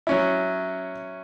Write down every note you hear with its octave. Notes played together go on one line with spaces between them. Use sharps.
F#3 C#4 E4